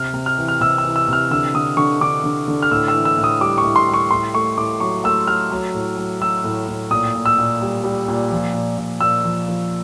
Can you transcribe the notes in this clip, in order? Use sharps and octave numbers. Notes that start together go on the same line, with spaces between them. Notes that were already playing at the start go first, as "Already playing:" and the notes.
Already playing: C3 F6
C3
F6
E3
F6
C3 E6
E6
E3
E6
C3 F6
D3 E6
D3 D#6
D3 C#6
D3 D6
D3
D3
F6
A2 E6
E6
E3
E6
A2
D#6
G3 D6
C#6
A2
C6
G3
C#6
A2 C6
A3 C#6
A2 D6
F#3 C#6
A3 E6
F#3 F6
F#3
A2
F#3
F#3 E6
A2
A2
A#2 D#6
A#2
E6
A#2
G3
G3
A#2
F3
A#2
A#2
A#2 E6
F3
F3